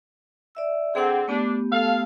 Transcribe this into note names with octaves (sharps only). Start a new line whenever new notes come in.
D5 E5 E6
D3 C4 G#4 F#5
A3 B3 D4 G4
A4 F5